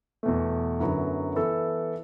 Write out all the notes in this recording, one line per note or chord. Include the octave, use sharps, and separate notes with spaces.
E2 B2 A3
F#2 D3 F#3 B3 E4
E3 B3 E4 A4